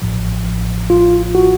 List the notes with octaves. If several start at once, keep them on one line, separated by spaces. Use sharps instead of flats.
A1 A2 F3
F4
F#4